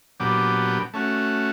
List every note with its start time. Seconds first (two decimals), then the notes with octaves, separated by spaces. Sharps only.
0.20 A#2 F#3 B3 D4 G4
0.94 A3 C#4 F#4